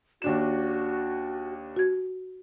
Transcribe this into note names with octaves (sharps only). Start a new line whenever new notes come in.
D#2 D4 F#4 E7
F#4 G#6